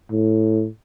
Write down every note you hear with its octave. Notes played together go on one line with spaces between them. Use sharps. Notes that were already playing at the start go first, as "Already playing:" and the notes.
A2